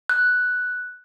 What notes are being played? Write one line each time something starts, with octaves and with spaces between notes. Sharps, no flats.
F#6